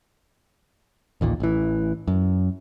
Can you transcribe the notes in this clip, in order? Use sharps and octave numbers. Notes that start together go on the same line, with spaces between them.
A1 D#2 A#2
A1 E3
F#2